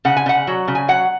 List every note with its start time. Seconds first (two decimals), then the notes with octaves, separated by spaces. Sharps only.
0.05 C#3 F#5
0.17 G#5
0.26 C#3 F#5
0.47 F#3
0.68 C#3
0.75 G#5
0.88 F#3 F#5